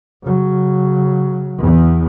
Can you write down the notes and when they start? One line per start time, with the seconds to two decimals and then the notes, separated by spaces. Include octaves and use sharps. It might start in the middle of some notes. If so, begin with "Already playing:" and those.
0.23 C#3 F#3
1.62 E2